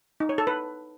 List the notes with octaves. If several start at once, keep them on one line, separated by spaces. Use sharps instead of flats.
D#4
C#5
A4
B4